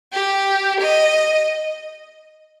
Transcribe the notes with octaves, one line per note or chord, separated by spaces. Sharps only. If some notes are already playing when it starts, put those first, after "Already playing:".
G4
D#5